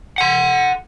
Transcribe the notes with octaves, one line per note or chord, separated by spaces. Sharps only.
F#5 C6